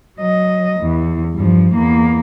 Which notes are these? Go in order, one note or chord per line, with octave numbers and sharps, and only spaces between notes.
F#3 D#5
E2
G2 F3
E2 A#3